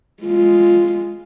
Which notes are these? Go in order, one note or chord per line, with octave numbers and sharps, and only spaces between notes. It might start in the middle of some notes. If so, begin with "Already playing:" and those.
G#3 F4